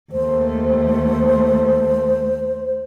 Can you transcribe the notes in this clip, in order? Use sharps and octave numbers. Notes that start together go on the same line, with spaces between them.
D#2 A3 C5